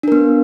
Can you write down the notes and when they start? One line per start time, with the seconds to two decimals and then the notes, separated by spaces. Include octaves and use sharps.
0.03 D4
0.08 A#4
0.12 B3